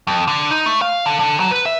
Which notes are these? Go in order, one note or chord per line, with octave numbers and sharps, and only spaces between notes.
F2
D3
D#4
A3
F5
D3
D3
F#3
B4
E5